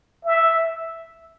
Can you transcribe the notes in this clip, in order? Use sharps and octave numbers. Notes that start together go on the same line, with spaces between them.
E5